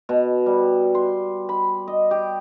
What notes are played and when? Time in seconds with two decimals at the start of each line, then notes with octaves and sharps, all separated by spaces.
0.09 B2
0.46 G3
0.95 C6
1.49 B5
1.88 D#5
2.11 G4